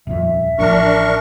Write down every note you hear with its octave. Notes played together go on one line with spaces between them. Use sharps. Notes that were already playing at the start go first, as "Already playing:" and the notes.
D#1 F2 E5
A1 F3 D4 A#4 C#6